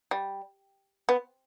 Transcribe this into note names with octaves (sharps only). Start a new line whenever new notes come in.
G3
B3